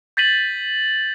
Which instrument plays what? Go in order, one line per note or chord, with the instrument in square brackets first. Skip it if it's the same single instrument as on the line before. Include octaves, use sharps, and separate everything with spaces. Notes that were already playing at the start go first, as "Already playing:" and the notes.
[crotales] G6 A6 B6 D#7 F#7